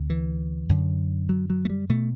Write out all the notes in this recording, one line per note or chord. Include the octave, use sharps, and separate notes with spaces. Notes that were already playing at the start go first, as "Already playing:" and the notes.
Already playing: D2 C3
E3
F#2 D3
F#3
F#3
A3
G3
B2 A3